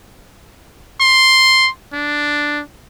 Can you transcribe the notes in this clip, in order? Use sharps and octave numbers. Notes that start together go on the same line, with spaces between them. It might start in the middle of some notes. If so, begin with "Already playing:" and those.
C6
D4